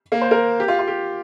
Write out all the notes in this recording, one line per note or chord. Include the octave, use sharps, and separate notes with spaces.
A#3
C5
A#4
G4
F4
F4
G4